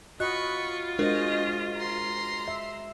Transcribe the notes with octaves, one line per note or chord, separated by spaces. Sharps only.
F4 F#4 D#5 B5 C#6 F#6
G#3 D4 F#4 A#4 C5 D#5
A#5 C6
E5